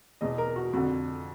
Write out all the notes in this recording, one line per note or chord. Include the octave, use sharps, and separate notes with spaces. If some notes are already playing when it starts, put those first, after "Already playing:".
E2 B2 D#5
A#4
F#4
F2 D3 F#4